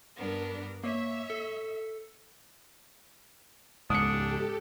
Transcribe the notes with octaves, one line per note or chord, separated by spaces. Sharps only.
G2 B3 D4 A#4
A#3 C#5 E5
A4
C#2 G#2 D4 G4 A4 D#6 C#7